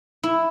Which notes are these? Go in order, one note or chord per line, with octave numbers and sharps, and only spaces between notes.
E4